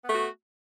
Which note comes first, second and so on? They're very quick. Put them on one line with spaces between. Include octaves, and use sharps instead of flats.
B3 A3 F#4